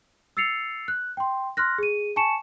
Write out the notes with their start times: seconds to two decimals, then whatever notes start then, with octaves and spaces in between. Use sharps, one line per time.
0.37 E6 A6 C7 C#7 F7
0.88 F#6
1.17 G5 C6
1.57 C6 F6 F#6 A#6
1.78 G#4 D#7
2.16 G#5 A5 C#6 C#7 E7